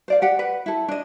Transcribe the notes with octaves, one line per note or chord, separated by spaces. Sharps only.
C5 D5 F5
G4 F#5
B4
E4 A4
D4 D#5